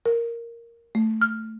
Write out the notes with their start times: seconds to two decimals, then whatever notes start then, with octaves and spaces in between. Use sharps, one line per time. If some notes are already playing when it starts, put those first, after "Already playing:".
0.06 A#4
0.95 A3
1.21 F6